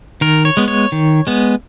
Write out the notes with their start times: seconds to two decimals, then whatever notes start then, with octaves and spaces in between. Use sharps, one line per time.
0.21 D#3 A#4
0.45 C#5
0.57 G#3 B3
0.68 C#5
0.92 D#3
1.27 G#3 B3